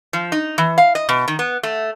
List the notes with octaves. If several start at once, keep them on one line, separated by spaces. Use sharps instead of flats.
F3
D#4
E3
F5
D#5
B2
D#3
B3
A3